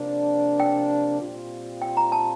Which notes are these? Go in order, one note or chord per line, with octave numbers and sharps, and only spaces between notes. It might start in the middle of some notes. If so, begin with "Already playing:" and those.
Already playing: C3 F3 A#3 D4
G5
A#2 G3 C4 F4
G5
A#5
A5